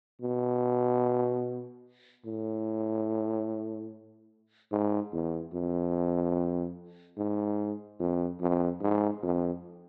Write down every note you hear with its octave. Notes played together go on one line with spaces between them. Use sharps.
B2
A2
G#2
E2
F2
G#2
F2
F2
G#2
F2